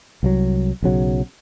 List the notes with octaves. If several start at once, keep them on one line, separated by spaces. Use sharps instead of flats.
C2 F3 F#3
B1 C#3 F#3